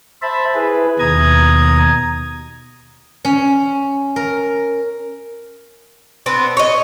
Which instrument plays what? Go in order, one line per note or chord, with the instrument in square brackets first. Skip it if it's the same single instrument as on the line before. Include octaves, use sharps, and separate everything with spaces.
[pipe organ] C5 E5 A5 B5
E4 G#4 B4
D#2 B2 A#5 D#6 G#6
[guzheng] C#4
A#4
[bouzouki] B3 C4 D4
C#5 D#5